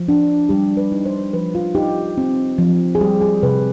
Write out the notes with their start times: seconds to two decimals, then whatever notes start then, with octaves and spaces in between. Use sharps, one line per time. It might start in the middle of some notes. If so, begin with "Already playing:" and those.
Already playing: F3
0.08 D4
0.49 G3 G4
0.77 B4
0.92 D#4
1.06 C5
1.33 F3 B4
1.55 F4
1.75 D#4 G4
2.18 C4
2.58 F3
2.95 G#4
3.01 G3 G4
3.21 G#4
3.43 C3 B4